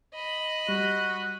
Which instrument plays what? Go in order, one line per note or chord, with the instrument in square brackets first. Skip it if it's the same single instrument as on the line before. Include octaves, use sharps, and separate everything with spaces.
[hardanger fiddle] D#5 B5
[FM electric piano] G3 [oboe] F#4